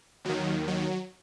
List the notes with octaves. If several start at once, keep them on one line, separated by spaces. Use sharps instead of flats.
D#2 D#3 F#3
F#3